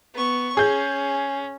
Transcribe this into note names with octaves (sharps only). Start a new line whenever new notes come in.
B3 C#6
C#4 G#4 G6